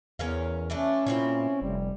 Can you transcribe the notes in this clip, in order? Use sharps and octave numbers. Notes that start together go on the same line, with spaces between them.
E2 C#4 A#4 F5
E3 A3 C#4 D4
A#2 C4 E4 C#5
F1 G3